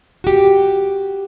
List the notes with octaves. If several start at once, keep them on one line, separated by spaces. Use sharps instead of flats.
F#4 G4